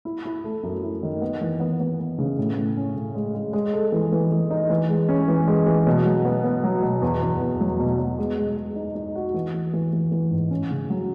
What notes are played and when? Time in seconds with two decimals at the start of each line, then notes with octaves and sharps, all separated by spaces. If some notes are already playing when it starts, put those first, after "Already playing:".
0.05 E4
0.25 E4
0.44 A3
0.63 F#2
0.83 E4
1.03 D#3
1.22 B3
1.41 E3
1.60 B3
1.80 B3
2.00 B3
2.19 C#3
2.38 A2
2.57 A2
2.77 C#4
2.96 A2
3.15 G#3
3.35 G#3
3.53 G#3
3.73 A4
3.92 E3
4.12 E3
4.31 E3
4.51 D#4
4.70 E3
4.89 G#3
5.09 C#4
5.28 E3
5.47 G#3
5.67 E3
5.87 B2
6.06 F#3
6.25 B3
6.44 B3
6.64 F#3
6.83 B2
7.02 E2
7.22 E2
7.41 E2
7.60 F#3
7.79 B2
7.99 B2
8.18 G#3
8.38 G#3
8.57 G#3
8.76 D#4
8.95 D#4
9.16 F#4
9.34 E3
9.54 E3
9.73 E3
9.93 E3
10.12 E3
10.31 G#2
10.51 C#4
10.71 C#3
10.90 F#3